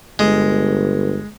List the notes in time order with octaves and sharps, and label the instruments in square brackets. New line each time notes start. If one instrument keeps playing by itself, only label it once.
[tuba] G1 [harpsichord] G#3